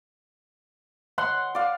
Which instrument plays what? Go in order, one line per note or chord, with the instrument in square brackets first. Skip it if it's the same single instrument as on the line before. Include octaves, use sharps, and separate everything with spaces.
[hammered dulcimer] F#5 C6
[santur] D5 F5